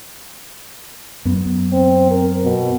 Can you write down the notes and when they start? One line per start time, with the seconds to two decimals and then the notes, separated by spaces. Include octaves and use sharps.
1.25 F#2 B3
1.73 C4
2.11 A#4
2.43 B2